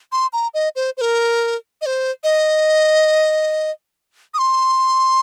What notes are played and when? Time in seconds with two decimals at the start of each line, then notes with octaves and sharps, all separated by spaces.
0.12 C6
0.33 A#5
0.54 D#5
0.76 C5
0.97 C5
1.01 A#4
1.81 D#5
1.86 C5
2.23 D#5
4.34 D#6
4.38 C6